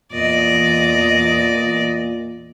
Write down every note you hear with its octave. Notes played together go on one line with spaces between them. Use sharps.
E2 A#2 D5 D#5